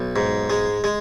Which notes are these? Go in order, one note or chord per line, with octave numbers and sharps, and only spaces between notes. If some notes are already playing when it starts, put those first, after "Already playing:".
Already playing: B1
G#2
G#3
G#3